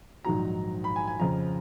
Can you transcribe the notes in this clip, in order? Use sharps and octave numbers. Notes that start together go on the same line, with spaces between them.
A#1 G#2 D#3 F#3 A#5
B5
G#5
G#5
F2 C#3 F3 A#5